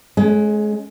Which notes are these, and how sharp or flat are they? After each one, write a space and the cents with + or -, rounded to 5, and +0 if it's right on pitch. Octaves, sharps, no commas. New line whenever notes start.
G#3 +30 C#4 +0